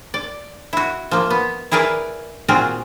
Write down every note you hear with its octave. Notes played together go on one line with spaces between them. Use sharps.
D5
E4 F#4
F3 A#3
B3
E4 G#4 A#4 B4 D5
A#2 C4 F4 F#4 G#4 A#4